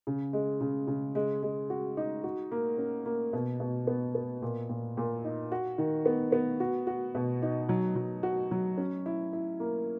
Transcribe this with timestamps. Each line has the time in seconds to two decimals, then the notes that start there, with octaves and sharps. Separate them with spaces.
0.07 C#3
0.33 G#3
0.61 C#3
0.87 C#3
1.15 G#3
1.43 G#3
1.70 F#4
1.97 D#4
2.24 F#4
2.52 A#3
2.78 C#4
3.06 A#3
3.33 B2
3.60 B2
3.87 B3
4.15 B3
4.42 A#2
4.69 A#2
4.97 A#2
5.25 D#4
5.52 F#4
5.78 D#3
6.06 B3
6.32 B3
6.60 F#4
6.87 F#4
7.15 B2
7.42 D#4
7.69 F#3
7.96 F#3
8.23 F#4
8.51 F#3
8.78 C#4
9.06 E4
9.33 E4
9.60 A#3